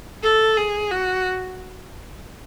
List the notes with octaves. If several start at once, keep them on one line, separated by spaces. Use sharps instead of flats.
A4
G#4
F#4